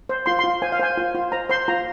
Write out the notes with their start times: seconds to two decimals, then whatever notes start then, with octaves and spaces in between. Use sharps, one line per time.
0.09 C5
0.26 F4 C6
0.39 F4 C6
0.62 C5 G#5
0.72 F5
0.79 C5 G#5
0.97 F4
1.15 F4
1.32 C5 A#5
1.49 C5 C6
1.68 F4 A#5